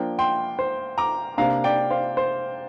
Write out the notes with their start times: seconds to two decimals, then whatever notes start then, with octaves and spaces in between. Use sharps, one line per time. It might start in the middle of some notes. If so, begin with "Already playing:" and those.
Already playing: F3 A#3 D4 G5
0.19 G5 C6
0.59 C5
0.98 A#5 D6
1.38 C3 A#3 D4 F5 A#5
1.64 D5 G5
1.90 C5 F5
2.17 C5